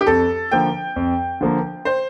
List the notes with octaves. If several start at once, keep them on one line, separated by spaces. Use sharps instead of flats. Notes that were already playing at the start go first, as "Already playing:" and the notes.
G4
F2 A4
D3 F3 A#3 G5
F2
D3 F3 A#3
C5